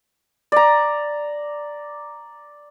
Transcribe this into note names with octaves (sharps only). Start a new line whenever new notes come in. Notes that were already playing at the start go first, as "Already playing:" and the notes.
D5 A#5